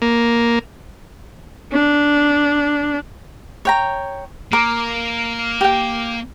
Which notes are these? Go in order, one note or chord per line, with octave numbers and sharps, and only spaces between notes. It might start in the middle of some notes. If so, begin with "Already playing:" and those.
A#3
D4
C#5 G5 A#5
A#3 A#4 D6
G4 G5